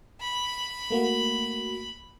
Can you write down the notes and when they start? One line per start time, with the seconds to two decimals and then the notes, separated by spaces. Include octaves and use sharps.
0.21 B5
0.90 A3 A#3 F#4